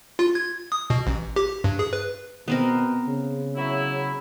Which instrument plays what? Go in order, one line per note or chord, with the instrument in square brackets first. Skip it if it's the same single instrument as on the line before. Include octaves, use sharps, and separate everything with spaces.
[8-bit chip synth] F4
G#6
D#6
B2
A1
G4
G2
G#4
B4
[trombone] B2 [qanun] B3 C4 A#4
[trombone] C#3
[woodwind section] F#3 E4